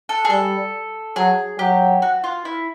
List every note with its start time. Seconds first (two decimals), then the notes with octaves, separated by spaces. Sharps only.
0.09 A4
0.25 G#4
0.30 G3 A4
1.16 F#3 G#4
1.59 F#3 G4
2.02 F#4
2.24 F4
2.45 E4